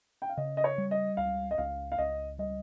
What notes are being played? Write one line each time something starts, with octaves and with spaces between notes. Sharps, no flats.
G5
F5
C#3 D#5
D#5
C#5
G3
D#5
C#2 F5
D#5
C#2 F5
F5
C#2 D#5
G3 D#5